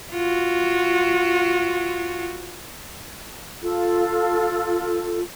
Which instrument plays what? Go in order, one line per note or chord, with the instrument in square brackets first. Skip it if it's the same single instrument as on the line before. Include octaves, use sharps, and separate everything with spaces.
[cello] F4 F#4
[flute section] F4 A4